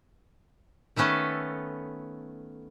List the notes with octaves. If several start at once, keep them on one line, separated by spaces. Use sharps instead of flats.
D#3 A3 B3 C#4 A4